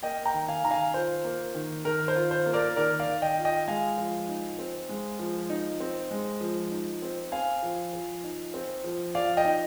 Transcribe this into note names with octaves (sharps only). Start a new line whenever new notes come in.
A#3 D#5 G5
G5 A#5
D#3
F5 G#5
D#3 A#5
F5 G#5
F4 C5
A#3
D#3
D#3 A#4
C5
F4
C5
A#3
A#4 D5
D#3 A#4 D5
D5 F5
D#3
D#5 G5
F4
D#5 G5
G#3 F5 G#5
F3
D#4
C4
G#3
F3
D#4
C4
G#3
F3
D#4
C4
C4 F5 G#5
F3
F3
D#4
C4
F3
F3 D5 F5
D#5 G5
D#4